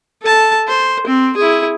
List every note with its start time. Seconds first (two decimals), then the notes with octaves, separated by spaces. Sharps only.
0.22 A4 A5
0.68 C5
1.07 C4
1.37 E4 G#4